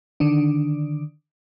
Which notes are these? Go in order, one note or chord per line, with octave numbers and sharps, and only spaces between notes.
D3 D#3 D4